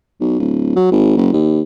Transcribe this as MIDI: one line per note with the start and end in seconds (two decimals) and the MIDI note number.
0.21 0.34 35
0.39 0.73 26
0.76 0.90 54
0.91 1.13 32
1.17 1.30 30
1.33 1.61 39